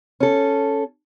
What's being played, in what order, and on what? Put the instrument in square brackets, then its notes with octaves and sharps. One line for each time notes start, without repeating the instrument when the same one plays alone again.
[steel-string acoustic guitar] C#4 A4